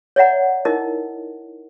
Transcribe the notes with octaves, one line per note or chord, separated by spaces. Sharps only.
C#5 D5 E5 F#5 A#5
D#4 E4 A#4 D#5